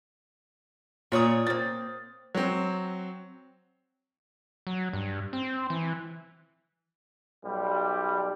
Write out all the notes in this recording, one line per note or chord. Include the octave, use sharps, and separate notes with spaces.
A#2 F4 C#5 D5 D#6
A#3 C4 A6
F#3 C4
F#3
G2
C4
E3
B1 G3